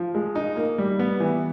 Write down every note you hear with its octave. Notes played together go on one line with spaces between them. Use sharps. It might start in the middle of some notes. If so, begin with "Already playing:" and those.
Already playing: F3
G#3
D#4
A#3
G3
B3
E3